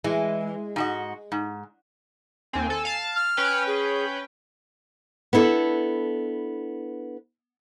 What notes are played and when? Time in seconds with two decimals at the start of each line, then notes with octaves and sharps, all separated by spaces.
0.04 E3 G#3
0.76 G#2 F#4 D#5
1.32 G#2
2.53 D#2 C4 G#5
2.70 A4
2.85 F5 A5
3.16 F6
3.37 C#4 B4 G5
3.67 G#4
5.33 B3 D4 E4 A4